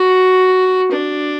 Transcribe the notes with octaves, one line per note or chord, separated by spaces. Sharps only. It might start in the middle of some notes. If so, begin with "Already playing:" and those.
Already playing: F#4
D4